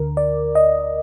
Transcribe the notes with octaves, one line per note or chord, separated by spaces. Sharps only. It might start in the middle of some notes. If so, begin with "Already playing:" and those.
Already playing: D2 D3 A#4
D5
D#5